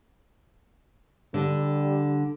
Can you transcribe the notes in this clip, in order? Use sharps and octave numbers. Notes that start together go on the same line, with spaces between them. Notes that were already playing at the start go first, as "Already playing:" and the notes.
D3 G3